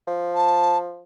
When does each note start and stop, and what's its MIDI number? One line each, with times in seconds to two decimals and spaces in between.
0.07 1.03 53
0.35 0.78 81